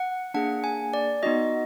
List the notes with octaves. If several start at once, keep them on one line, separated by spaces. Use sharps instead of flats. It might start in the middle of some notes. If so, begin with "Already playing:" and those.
Already playing: F#5
A#3 D4 G#4 F#5
G#5
D5
B3 D#4 F#4 D#5